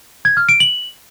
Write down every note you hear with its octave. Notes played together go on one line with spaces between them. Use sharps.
G#6
F6
D7
F#7